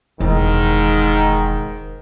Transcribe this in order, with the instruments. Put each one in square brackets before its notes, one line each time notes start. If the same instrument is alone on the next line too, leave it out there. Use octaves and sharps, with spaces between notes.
[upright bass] E1 [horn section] G#2 D#3